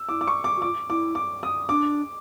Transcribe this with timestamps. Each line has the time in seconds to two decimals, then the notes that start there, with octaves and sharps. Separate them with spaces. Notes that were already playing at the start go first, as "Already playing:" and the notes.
Already playing: E6
0.09 E4 D6
0.21 D6
0.27 C#6
0.44 D6
0.57 F#4
0.62 F4 D6
0.90 E4 D6
1.15 D6
1.43 D#6
1.69 D4 D6